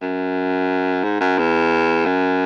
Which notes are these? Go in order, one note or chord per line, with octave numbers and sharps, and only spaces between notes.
F#2
G#2
F#2
E2
F#2